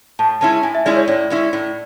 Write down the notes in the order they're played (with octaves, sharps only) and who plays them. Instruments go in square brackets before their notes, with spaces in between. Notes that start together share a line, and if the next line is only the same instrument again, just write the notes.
[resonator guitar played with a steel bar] A2 [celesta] A5
[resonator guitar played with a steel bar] G#3 C#4 E4 [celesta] A5
[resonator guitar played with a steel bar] A2 [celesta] G#5
[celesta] E5
[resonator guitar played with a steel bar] G#3 C#4 E4 [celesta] D5
[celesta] C#5
[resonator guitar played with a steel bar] A2 [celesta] D5
[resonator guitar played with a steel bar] G#3 C#4 E4
A2